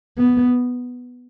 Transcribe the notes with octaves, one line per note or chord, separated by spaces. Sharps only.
B3